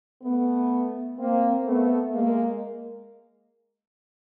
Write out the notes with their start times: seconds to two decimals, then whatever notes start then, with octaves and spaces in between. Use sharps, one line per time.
0.23 A3 B3
1.18 A#3 C4
1.65 A3 B3
2.13 G#3 A#3